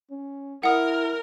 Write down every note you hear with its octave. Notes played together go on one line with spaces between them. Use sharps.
C#4
E4 A#4 F#5 D#6